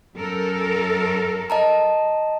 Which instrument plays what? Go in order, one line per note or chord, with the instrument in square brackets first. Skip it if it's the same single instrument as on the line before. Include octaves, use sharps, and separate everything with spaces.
[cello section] F#2 A4 A#4
[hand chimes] D#5 A5 A#5